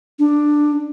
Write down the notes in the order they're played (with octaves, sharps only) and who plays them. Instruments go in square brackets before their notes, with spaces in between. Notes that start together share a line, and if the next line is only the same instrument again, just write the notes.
[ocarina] D4